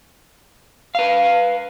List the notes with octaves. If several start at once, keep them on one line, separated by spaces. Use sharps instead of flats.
B4 F5